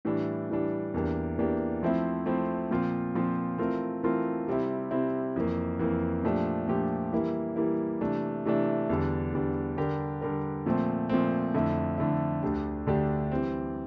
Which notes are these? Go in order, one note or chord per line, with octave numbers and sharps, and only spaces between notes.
A2 E3 G3 D4
A2 E3 G3 D4
E2 E3 A#3 D4 G4
E2 E3 A#3 D4 G4
F3 A3 C4 E4
F3 A3 C4 E4
A#2 F3 C4 F4
A#2 F3 C4 F4
E3 A3 C4 F4 A#4
E3 A3 C4 F4 A#4
C3 G3 C4 E4
C3 G3 C4 E4
F2 E3 A#3
F2 E3 A#3
A#2 F3 A3 D4 G4
A#2 F3 A3 D4 G4
E3 G3 A#3 E4
E3 G3 A#3 E4
C3 E3 A3 D4
C3 E3 A3 D4
E2 D3 G3 D4
E2 D3 G3 D4
D3 G3 D4 G4 A#4
D3 G3 D4 G4 A#4
A#2 F3 A3 C4
A#2 F3 A3 C4
F2 D3 A3 E4
F2 D3 A3 E4
D2 D3 A3 D4 G4
D2 D3 A3 D4 G4
E3 G3 C4